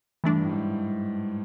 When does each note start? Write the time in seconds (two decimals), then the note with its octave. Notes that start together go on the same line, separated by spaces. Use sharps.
0.24 G2 E3 A3 D4
0.42 A2
0.49 G#2